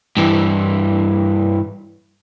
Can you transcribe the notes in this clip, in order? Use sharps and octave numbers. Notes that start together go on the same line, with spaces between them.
G2 E3